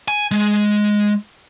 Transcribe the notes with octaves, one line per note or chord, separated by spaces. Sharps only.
G#5
G#3